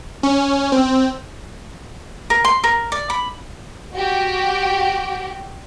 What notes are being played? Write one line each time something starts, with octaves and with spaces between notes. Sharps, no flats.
C#4
C4
A#4
C6
A#4
D5
B5
F#4 G4